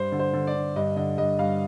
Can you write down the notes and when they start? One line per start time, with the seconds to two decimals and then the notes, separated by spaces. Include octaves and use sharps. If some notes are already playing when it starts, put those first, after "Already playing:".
Already playing: G2 C5
0.12 D3
0.19 C5
0.33 D3
0.47 D5
0.54 D3
0.76 G2 D#5
0.96 D3 D#5
1.17 G2 D#5
1.39 G2 F5